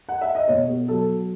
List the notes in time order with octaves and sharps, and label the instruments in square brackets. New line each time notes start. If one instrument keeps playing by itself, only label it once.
[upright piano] F#5
E5
D#5
B2 C#5
B3
F#3 A4